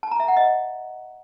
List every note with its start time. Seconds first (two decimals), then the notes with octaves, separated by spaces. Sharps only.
0.03 A5
0.11 A#5
0.20 E5
0.28 F#5
0.37 D#5